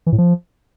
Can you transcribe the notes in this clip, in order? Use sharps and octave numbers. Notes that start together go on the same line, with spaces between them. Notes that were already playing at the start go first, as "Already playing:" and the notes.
E3
A2
F3